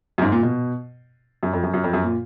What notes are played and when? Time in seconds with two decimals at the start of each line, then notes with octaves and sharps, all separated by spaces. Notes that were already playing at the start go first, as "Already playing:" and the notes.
0.18 F#2
0.22 G#2
0.32 A#2
0.43 B2
1.43 F#2
1.53 F2
1.63 F#2
1.74 F#2
1.84 F2
1.93 F#2
2.04 A#2